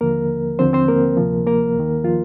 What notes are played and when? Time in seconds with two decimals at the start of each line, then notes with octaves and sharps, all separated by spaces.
0.01 D#2 D3 F3 A#3 A#4
0.59 D#2 D3 F3 C4 C5
0.73 C4 C5
0.88 A#3 A#4
1.17 D2 C3 F3
1.47 A#3 A#4
1.75 D#2 D#3
2.04 F3 F4